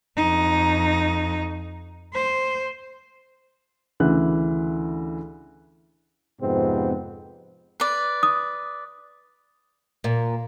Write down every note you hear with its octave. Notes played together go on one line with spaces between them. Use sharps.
F2 D#4
C5
D2 C#3 E3 F#6
F2 G#2 C3 B3 C4
B4 D5
D#6
A#2